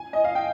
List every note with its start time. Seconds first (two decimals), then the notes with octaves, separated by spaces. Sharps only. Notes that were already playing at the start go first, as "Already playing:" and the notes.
Already playing: G#5
0.13 D#5
0.24 F5
0.35 G5